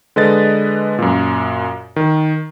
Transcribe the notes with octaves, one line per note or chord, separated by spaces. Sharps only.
D3 G#3 B4 D#5 A6
F#2 A#2
D#3